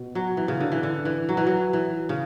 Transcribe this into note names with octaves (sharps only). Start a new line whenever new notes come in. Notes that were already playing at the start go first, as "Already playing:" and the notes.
Already playing: B2
F#3
E3
C#3
D3
E3
D3
E3
F#3
E3
F#3
E3
C#3